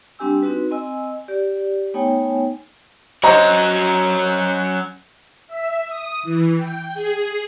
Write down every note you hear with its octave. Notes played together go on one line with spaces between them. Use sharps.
G3 C4 D4 G4 G#5 E6
C4 D#4 F#4 B4
C4 D#5 G#5 E6
G4 D5
A3 B3 D#4 C#5 G5 G#5
F#3 C#4 F#4 C5 D#5 A#5
E5
D#6
E3
G5
G#4